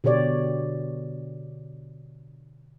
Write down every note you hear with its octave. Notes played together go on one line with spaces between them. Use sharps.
B2 D3 G4 C#5 D5